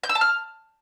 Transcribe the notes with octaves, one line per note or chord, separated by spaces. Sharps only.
G6
E6
A5
F6